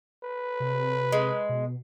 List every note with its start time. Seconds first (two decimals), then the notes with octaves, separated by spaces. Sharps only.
0.23 B4
0.60 C3
1.12 G#3
1.49 B2